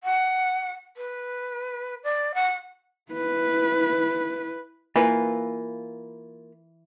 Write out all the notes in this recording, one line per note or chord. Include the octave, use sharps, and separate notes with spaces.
F#5
B4
D5
F#5
E4 B4
E3 A#3 F4 B4